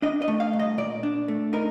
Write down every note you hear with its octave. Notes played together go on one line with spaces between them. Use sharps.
D4 D#5
D#5
A3
F5
C2
D#5
A#2 D5
D4
A3
D#4 A#4